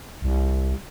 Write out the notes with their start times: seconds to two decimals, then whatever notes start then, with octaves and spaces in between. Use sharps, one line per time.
0.22 C2